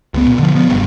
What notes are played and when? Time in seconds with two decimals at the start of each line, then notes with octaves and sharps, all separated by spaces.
0.14 C#2 B3
0.27 A#2
0.39 D3 F3
0.55 F3 B3
0.69 F1 G2